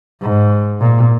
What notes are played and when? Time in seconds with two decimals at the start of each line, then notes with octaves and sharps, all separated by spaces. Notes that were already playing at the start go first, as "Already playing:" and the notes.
0.22 G#2
0.81 A#2